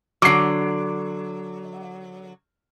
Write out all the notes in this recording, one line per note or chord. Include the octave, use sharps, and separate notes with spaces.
D3 F#3 D6 C7